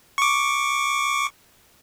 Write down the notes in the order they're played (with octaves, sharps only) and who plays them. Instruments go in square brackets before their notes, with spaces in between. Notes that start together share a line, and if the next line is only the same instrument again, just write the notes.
[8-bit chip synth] C#6 D6